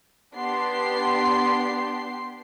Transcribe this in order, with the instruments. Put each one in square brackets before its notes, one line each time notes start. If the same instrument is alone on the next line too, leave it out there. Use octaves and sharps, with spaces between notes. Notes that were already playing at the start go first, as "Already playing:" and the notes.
[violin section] B3 D4 G4 C6 C7